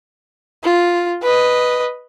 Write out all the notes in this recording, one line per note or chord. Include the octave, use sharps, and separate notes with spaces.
F4
B4 D#5